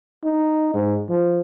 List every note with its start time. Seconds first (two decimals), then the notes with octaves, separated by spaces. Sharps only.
0.24 D#4
0.74 G#2
1.09 F3